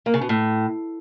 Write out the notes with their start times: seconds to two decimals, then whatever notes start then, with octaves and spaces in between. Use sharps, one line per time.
0.06 A#3
0.14 C#3
0.21 B2
0.29 A2